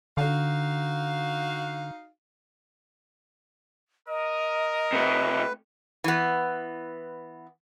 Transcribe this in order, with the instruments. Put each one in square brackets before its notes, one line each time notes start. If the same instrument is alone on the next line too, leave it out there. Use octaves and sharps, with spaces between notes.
[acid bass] D3 [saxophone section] D#4 F#4 F5
[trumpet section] A#4 D#6 [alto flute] D#5
[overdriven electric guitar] C3 A3 [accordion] B4
[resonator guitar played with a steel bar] E3 B3